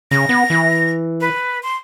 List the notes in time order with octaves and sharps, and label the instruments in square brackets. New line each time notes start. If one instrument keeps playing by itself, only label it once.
[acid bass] C#3 [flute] A#6
[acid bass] B3
E3
[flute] B4
C6